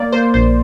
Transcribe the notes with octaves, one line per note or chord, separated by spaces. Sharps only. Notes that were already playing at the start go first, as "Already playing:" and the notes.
Already playing: A#3 D5
A#3 C5
A#1 C5